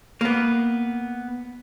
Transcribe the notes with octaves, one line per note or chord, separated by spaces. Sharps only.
A#3 B3